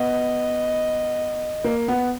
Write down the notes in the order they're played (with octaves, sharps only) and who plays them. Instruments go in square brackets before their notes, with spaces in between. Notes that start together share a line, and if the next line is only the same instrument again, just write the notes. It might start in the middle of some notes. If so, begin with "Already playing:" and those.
Already playing: [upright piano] B3 [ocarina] D#5
[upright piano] A#3
B3